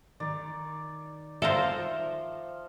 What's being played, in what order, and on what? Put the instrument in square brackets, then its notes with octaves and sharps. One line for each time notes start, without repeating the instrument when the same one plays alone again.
[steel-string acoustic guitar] D#3 [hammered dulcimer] D5
[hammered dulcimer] F3 F5 [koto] A4 A#4 C5 [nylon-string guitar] E5